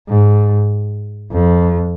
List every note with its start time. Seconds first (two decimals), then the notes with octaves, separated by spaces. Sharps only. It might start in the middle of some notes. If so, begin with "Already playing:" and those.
0.09 G#2
1.32 F2